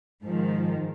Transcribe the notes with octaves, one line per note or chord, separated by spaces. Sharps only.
G#2 D#3 F3